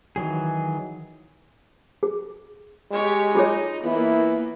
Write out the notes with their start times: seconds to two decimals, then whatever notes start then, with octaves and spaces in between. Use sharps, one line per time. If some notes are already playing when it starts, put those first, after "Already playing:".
0.16 D#3 E3 F#3 G#4
2.03 G#4
2.91 G#3 G4 C#5
3.35 D#4 F4 G#4 C#5
3.84 E3 A#3 B3 E4